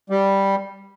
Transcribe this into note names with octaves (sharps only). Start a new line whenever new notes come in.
G3